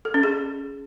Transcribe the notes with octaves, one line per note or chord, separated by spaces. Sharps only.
A4
C#4
G#4